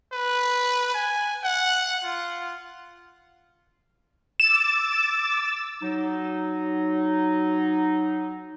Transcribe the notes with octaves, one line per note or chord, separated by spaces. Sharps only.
B4
G#5
F#5
F4
D6 E6 A6 E7
F#3 D#4